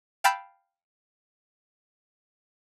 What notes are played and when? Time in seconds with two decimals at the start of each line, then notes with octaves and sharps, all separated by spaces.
0.24 F5 G5 A5 B5 E6 G6